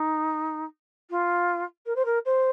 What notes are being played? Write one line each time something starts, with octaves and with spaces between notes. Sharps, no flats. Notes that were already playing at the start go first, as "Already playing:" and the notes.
Already playing: D#4
F4
A#4
C5
A#4
C5